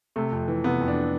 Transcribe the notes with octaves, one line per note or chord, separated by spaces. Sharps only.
C3 A3
F2
E3
C3 B3
F2
D4